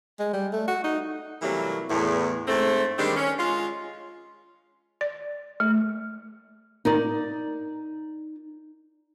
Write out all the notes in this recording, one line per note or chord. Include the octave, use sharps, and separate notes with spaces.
G#3
G3
A3
F#4
D#4
C3 E3 F#3 G3 A3 A#3
E2 A2
G#2 A3 C4
D#3 G3 G#3 C4 D4
C#4
G#3 F4
D5
A3
D#4 A#4 D5